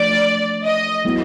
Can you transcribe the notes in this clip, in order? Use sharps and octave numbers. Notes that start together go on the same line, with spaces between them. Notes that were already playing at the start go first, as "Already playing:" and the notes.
Already playing: F3 A3 D4 D5
D#5
F#3 B3 E4